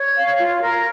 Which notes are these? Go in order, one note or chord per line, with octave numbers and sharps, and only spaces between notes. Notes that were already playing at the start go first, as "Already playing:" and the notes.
Already playing: C#5
F5
F4
A#4